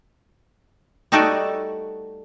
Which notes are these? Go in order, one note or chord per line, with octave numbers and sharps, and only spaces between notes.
G3 A3 D#4 F#4 A4 D5